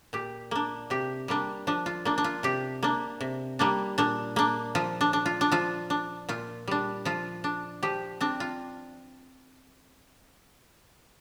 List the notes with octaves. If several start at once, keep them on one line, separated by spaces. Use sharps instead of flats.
A#2 G4
A#3 D4
C3 G4
G3 A#3 D4
F3 D4
F4
A#3 D4
D4
F4
C3 G4
A#3 D4
C3
G3 A#3 D4
A#2 D4
A#3 D4
F3 F4
D4
D4
F4
D4
F3 F4
D4
A#2 F4
G3 D4
F3 F4
D4
F3 G4
C4 D4
F4